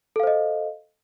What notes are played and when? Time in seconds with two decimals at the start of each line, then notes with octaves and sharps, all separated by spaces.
0.16 A4
0.20 F5
0.23 C5
0.27 D#5